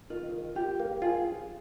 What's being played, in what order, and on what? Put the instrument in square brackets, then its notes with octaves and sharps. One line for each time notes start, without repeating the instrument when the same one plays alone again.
[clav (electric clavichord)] D#3 [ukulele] F4
[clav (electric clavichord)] D#3
[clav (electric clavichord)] F4 [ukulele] G4
[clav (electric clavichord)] A#3
[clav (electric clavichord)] F4 [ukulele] G#4